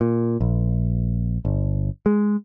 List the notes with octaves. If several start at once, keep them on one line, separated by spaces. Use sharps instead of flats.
A#2
A#1
G1
G#3